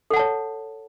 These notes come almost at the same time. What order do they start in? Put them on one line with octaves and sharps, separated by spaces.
A4 F#5 A5 C#5